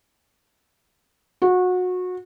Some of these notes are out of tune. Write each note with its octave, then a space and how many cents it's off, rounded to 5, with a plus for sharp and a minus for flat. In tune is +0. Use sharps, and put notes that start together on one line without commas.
F#4 -25